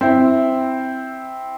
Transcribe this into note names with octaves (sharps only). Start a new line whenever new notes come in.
C4 E4